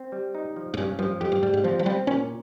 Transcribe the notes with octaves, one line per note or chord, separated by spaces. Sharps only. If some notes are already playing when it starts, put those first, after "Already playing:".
Already playing: C4
G3
D#4
F3
G#2
G2 C#4
G2 F3
F2 G4
G2
G#2 G3
G#2
F3 C4
F3
G3 C4
A#2 C#4